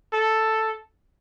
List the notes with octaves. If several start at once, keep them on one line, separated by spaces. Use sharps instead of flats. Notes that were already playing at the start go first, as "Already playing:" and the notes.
A4